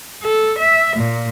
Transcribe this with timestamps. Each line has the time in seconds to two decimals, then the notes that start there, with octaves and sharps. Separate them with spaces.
0.23 A4
0.59 E5
0.96 A#2